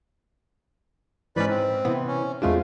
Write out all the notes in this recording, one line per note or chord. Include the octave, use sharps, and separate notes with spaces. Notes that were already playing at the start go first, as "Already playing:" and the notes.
G#2 E3 C#4 B4 D5 B5
C4
C3 E3 B3
C#4
E2 G#3 A3 C4 D4 F4 G#4